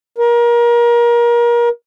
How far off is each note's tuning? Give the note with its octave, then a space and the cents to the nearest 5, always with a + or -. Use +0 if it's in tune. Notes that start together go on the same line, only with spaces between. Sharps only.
A#4 +30